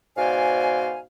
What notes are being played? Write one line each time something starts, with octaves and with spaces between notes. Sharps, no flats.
G#2 B2 C5 D5 F5 G#5